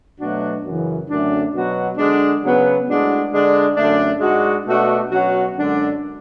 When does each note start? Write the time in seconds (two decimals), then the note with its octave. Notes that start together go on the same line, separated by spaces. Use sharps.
0.19 B2 F#3 A3 D4 F#4
0.63 F#2 C#3 E3
1.08 F#2 D3 A3 D4
1.53 B2 F#3 B3 F#4
1.97 D3 G#3 D4
2.42 C#3 F#3 B3 F#4
2.87 A2 G#3 D4 F#4
3.32 D3 G#3 D4
3.76 F#2 D3 A3 D4
4.20 G#2 G#3 D4 F#4
4.66 B2 A3 D4 F#4
5.10 B2 F#3 C#4 F#4
5.55 F#2 D3 G#3 D4